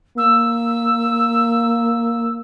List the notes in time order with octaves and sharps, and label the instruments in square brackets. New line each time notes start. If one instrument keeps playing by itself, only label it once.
[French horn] A#3 [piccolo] E6